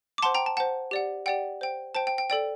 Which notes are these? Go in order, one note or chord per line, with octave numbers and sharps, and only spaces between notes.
D6
C5 F#5 A5 C6
G5 A#5
A5
C5 F#5 A5
G4 D5 F#5
G4 D5 F#5 G5
C5 G5
C5 G5 A5
G5
G5
A4 D5 G5